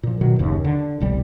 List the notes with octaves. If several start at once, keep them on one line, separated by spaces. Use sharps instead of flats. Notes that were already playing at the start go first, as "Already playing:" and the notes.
A#2 F3
B2 D#3 F#3
F#1 D#2 C#3
D3
E1 C2 G3